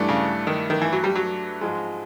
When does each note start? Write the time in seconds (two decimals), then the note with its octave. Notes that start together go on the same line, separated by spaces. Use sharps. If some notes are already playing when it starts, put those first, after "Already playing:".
Already playing: G2 E3 A3 D4
0.09 C#3
0.47 D#3
0.70 D#3
0.81 E3
0.93 F#3
1.04 G3
1.16 F#3
1.61 G#2 F3 G#3